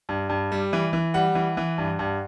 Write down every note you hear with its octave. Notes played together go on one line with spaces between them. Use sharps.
G2
G2
G3
E3
E3
G3 F#5
E3
E3
G2
G2